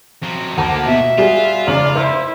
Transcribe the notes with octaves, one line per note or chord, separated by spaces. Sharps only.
F2 F#3
D2 A#3 D#4 A5 D6
B2 E5
G3 F4 F#4 G#4
F1 C#3 D5 F#7
E4 C5 E6